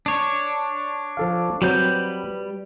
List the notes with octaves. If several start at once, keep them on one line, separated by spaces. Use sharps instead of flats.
D4 C#5
F3 A4 F5
F#3 G3 C4 B4 G6